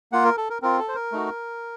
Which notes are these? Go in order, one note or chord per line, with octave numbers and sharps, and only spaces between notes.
A#3 F4 F#5
A#4
A4
A#4
C4 F4 A#4
A4
C5
A#4
A3 D#4 F#4